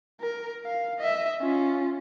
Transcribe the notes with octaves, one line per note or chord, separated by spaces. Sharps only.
A#4
F5
D#5 E5
C#4 F4